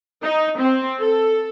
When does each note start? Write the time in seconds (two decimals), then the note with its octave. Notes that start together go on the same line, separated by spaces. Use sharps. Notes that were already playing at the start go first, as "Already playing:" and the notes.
0.22 D#4
0.59 C4
1.00 A4